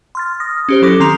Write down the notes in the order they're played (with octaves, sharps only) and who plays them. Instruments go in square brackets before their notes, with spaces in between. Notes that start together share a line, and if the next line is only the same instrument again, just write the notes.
[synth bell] C6 F6 A6
D#6 F6 A#6
C#4 G4 C5
F#3 E4 A4 D6 A#6
D#3 C4 A#5 C6 F7